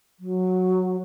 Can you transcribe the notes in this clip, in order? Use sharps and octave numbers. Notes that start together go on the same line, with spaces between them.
F#3